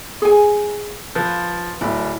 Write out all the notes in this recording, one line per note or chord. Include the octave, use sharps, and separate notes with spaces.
G#4 G#5
F3 B4
D1 E4